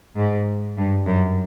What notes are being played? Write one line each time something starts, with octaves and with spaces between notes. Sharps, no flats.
G#2
G2
F#2